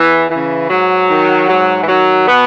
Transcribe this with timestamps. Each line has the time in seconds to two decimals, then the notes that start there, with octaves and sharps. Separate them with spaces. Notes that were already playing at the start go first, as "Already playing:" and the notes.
Already playing: E2 E3
0.30 C#3 E3
0.69 G#2 F#3
1.09 D#3
1.49 G#2 F#3
1.82 E3
1.88 D#3 F#3
2.28 B2 B3